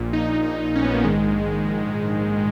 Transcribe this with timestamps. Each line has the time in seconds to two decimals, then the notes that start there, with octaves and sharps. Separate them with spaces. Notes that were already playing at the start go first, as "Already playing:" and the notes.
Already playing: A#1 A#2
0.13 D#4
0.66 D#4
0.75 C#4
0.84 B3
0.94 A#3
1.04 A#1 G#2 D#3 G#3